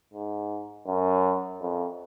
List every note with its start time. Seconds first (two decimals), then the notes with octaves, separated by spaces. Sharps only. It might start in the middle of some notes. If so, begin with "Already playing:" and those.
0.13 G#2
0.87 F#2
1.62 F2